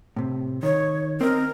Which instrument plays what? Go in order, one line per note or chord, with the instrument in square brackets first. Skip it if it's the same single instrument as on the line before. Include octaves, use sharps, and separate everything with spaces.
[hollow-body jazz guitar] A2 C3
[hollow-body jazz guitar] D#3 [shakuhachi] C#5
[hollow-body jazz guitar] C4 D#5 [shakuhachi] A#4